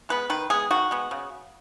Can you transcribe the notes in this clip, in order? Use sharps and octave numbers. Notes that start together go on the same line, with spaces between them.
G#3 B3 B4
D#3 B4
G#3 B3 G#4
D#3 F#4
G#3 B3
C#3